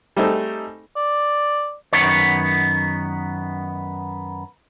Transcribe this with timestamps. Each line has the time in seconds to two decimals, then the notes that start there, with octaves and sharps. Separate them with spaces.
0.17 G3 A3 C4 D#4 G#4 A4
0.96 D5
1.93 F#2 D#3 B3 C#5